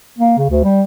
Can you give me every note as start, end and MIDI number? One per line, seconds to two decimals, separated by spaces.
0.18 0.33 58
0.38 0.48 49
0.49 0.63 38
0.64 0.83 55